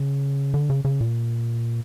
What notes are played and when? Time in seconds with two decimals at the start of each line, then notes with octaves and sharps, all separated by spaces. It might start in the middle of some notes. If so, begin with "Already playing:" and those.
Already playing: C#3
0.54 D3
0.70 C#3
0.85 C#3
1.01 A#2